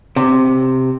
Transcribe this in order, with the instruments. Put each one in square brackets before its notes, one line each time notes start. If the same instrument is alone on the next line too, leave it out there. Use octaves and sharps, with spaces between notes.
[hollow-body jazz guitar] C3